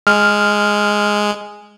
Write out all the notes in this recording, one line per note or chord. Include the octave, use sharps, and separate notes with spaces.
G#3 F6